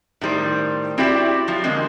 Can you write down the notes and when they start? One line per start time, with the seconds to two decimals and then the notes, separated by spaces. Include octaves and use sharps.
0.21 A2 D#3 G3 C5
0.98 C4 E4 F#4 G4 D5 E5
1.47 F3 F#3
1.64 D3 G#3 A#3 C4